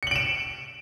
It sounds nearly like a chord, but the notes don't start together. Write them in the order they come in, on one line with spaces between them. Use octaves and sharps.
C#7 F#7 D7 E7